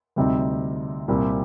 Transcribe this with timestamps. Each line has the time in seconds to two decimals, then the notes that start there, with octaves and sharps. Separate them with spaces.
0.16 D2 C3 G3 C4 D#4
1.08 C2 A#2 G3 C4 G4